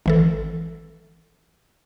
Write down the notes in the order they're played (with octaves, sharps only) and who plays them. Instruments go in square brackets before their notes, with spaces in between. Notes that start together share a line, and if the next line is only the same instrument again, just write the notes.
[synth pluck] G#1 E3 A4